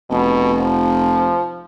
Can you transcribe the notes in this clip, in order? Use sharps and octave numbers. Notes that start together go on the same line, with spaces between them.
F1 B2
F3